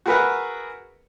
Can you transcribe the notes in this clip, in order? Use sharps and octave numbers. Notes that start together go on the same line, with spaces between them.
F#4 G#4 A#4 B4 E5 F#5